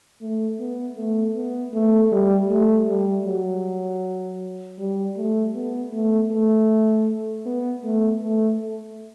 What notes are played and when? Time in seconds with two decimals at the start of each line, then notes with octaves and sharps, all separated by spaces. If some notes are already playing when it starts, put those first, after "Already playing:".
0.21 A3
0.59 B3
0.97 A3
1.36 B3
1.74 A3
2.12 G3
2.50 A3
2.88 G3
3.26 F#3
4.79 G3
5.17 A3
5.55 B3
5.93 A3
6.31 A3
7.46 B3
7.84 A3
8.22 A3